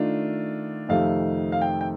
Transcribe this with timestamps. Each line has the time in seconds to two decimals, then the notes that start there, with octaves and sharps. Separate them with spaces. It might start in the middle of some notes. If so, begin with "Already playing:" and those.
Already playing: D#3 A3 D4 F4
0.89 F2 C3 D#3 A3 F5
1.52 F5
1.61 G5
1.81 G5